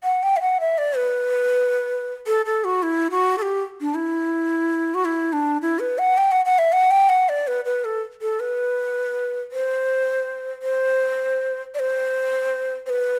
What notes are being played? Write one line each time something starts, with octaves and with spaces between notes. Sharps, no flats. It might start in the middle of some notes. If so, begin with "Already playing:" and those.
F#5
G5
E5
F#5
E5
D5
B4
A4
A4
F#4
E4
F#4
A4
G4
D4
E4
F#4
E4
D4
E4
B4
F#5
G5
F#5
F#5
E5
F#5
G5
F#5
D5
B4
B4
A4
A4
B4
C5
C5
D5
C5
C5
B4